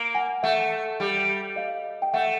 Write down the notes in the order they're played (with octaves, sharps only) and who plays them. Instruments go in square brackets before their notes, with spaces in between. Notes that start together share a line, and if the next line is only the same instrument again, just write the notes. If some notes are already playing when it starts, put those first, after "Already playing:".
Already playing: [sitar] A#3
[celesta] F#5 G#5
[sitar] A3 [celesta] E5 F#5
[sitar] G3
[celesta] D#5 F5
G5
[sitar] A3 [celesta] E5 F#5